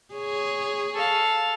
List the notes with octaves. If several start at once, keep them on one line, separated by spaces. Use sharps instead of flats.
G#4 C#5
A4 F5